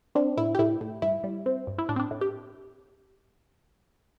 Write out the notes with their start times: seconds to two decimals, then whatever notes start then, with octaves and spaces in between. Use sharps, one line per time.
0.15 C4 D4
0.37 A2 E4
0.55 G4
0.59 A2 E4
0.81 A2
1.02 G2 E4
1.24 G3
1.46 C4
1.67 G2
1.78 E4
1.89 A2 D4
1.96 C4
2.00 D4
2.11 A2
2.21 G4